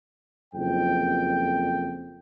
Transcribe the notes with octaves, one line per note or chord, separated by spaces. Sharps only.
F#1 F2 G5